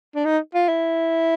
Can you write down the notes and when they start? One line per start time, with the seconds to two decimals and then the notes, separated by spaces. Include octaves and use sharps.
0.15 D4
0.25 D#4
0.54 F4
0.69 E4